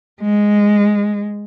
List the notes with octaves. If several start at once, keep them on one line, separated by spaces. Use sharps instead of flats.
G#3